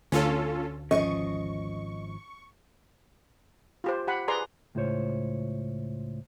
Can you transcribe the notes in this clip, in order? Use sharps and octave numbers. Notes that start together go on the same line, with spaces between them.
D2 C#4 F4 A4
G#1 F3 C#4 D#5 C#6
F4 G4 C5
G4 F#5 B5
G#4 B4 D5 A#5 C6
C#2 A2 F4 C5 C#5